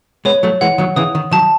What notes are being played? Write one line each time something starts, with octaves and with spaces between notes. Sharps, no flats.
G#3 B3 C#5
F#3 A3
E3 G#3 F#5
D#3 F#3
C#3 E3 D#6
D#3
D#3 F#3 A5